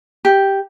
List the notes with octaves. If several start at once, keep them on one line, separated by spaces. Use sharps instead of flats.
G4